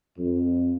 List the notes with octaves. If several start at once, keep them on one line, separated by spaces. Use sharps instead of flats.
F2